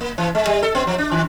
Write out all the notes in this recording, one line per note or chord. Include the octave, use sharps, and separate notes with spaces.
A#3
E3
G#3
G3
A4
B3
F3
D4
D#3